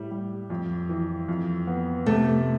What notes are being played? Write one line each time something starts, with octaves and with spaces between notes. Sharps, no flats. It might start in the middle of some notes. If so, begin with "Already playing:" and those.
Already playing: A2 G3
G3
F2
E3
F2
B3
C3 A3